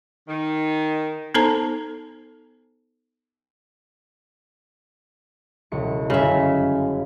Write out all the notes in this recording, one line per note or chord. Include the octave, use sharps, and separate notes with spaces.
D#3
B3 D#4 A4 C5 A5 A#5
E1 C#2 C#7
G1 F#2 C#3 C#4 E5